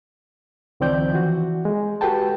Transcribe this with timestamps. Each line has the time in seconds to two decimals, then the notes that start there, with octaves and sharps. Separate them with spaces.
0.80 C#2 D#3 F3 C4 D5 G6
1.12 E3 F#4
1.65 G#3
2.01 F#4 G4 A4 B4 G5 A5